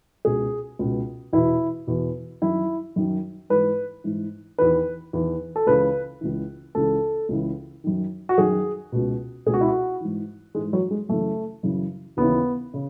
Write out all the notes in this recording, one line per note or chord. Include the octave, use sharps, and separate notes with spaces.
C#2 B2 G#4
C#2 B2
E2 B2 E4
E2 B2
F#2 D#3 E4
F#2 D#3
G#2 E3 B4
G#2 E3
E2 D#3 B4
E2 D#3
A4
C#2 C#3 E3 B4
C#2 C#3 E3
C#2 C#3 E3 A4
C#2 C#3 E3
F#2 D#3
F#4
F#2 D#3 G#4
C#2 B2
C#2 B2 G#4
F#4
E4
F#4
G#2 E3
G#2 E3 G#3
F#3
G#3
F#2 C#3 E3 A3
F#2 C#3 E3
D#2 C#3 E3 B3
C#3